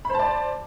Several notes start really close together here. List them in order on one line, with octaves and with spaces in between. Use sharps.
B5 C5 A5 D5